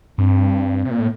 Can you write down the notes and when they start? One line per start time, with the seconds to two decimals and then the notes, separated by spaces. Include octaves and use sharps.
0.18 G2 C4
0.85 C3
0.90 A#2 A#3
1.00 A2